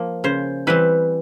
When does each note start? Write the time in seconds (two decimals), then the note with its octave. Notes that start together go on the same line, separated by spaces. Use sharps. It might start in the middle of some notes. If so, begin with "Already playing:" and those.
Already playing: F3 A#3
0.24 C#3 C5
0.67 E3 G3 C4 B4